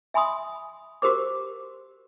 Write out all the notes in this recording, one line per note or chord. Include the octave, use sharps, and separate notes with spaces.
E5 G#5 B5 C6 D#6
F#4 G4 A#4 C5 D6